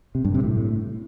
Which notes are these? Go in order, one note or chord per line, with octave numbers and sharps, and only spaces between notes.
C3
G2
C3
A2